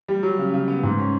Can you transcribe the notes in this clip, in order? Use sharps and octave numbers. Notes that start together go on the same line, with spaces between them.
G3
F#3
C#3
C#3
B3
G#2
C#4